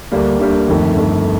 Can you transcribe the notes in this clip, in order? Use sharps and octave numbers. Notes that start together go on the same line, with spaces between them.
D2 D3 G3 A#3
D2 D3 G3 A#3
G1 F2 D#3 A3
G1 F2 D#3 A3